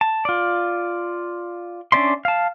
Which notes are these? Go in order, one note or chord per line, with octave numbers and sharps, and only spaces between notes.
A5
F4 D5
C#4 D4 D5 E5 C6
F5 A5